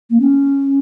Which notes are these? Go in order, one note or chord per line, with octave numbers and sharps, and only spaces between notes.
A#3
C#4